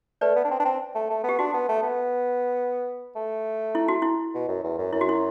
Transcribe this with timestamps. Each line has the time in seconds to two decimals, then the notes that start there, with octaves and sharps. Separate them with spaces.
0.21 A3 B4 D5
0.36 B3
0.44 D4
0.51 C4
0.59 D4
0.65 C4
0.95 A3
1.10 A3
1.24 B3
1.29 G4
1.39 D4 F#4
1.53 B3
1.69 A3
1.83 B3
3.16 A3
3.75 E4
3.88 F#4
4.02 E4
4.34 B2
4.48 F#2
4.63 E2
4.78 F#2
4.93 F#2 E4
5.01 F#4
5.09 E4